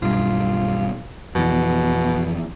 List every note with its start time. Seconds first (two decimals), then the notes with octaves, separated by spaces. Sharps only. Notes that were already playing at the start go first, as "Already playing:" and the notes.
0.02 B1 G2 F4
1.35 F2 B2 E3